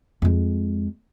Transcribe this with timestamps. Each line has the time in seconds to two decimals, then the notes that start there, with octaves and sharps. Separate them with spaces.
0.22 F2 G#3